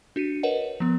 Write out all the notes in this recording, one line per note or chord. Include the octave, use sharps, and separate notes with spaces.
D4 F#4 C#7 D#7
A#4 B4 C#5 D#5 F#5
F3 B3